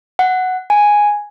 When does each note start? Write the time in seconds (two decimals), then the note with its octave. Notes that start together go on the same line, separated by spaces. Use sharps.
0.19 F#5
0.70 G#5